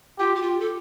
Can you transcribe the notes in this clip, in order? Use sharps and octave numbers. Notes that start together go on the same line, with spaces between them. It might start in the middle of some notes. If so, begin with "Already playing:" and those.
F4 G4
G4
F4
A4